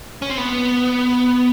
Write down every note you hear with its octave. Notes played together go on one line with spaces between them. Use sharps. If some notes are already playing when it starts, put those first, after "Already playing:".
C#4
C4
B3